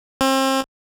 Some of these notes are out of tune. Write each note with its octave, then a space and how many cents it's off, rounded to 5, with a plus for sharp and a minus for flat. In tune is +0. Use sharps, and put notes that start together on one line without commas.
C4 +35